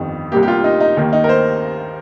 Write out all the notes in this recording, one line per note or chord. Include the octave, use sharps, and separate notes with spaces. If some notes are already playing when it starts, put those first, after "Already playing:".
Already playing: G1 F2 D#3 G3
C2 C3 G3 A#3 G4
G4
F4
D#4
D#4
D#2 D#3 A#3
D#4
A#4
C5